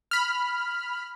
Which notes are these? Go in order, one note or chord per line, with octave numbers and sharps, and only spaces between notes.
B5 F6